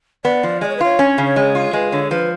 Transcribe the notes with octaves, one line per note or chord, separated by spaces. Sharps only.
B3 D5
F3
G#3 D5
C#5
B4
F4 C#5
C#4
C#3
G#3
F4
G#3 B4
D3 C#5
F3 B4